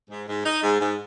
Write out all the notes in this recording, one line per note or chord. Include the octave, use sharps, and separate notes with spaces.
G#2
G#2
D#4
G#2
G#2